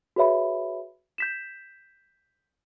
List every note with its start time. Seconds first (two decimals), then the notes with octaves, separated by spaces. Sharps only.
0.16 F#4 G#4 B4 C#5 E5 B5
1.18 G6 B6 E7